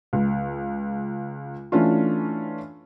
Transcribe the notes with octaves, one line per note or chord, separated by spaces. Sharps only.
C#2
E3 A3 C#4 D4 F4